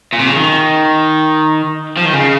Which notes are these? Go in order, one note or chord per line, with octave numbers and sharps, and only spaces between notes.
A#2
C3
C#3
D#3
F3
D#3
C#3